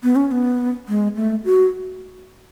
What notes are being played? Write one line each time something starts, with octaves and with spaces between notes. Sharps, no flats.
B3
C#4
C#4
B3
G#3
A3
F#4